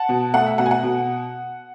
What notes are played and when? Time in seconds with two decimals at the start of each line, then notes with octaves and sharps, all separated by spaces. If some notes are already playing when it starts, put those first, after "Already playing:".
Already playing: F#5 A5
0.09 B2
0.34 A3 F#5
0.46 E5
0.58 B2 F#5
0.66 G#5
0.71 F#5
0.83 B2